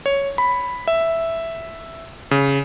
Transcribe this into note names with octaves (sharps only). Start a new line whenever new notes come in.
C#5
B5
E5
C#3